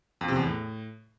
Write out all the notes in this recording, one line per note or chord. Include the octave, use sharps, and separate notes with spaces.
F2
C3
E2
A2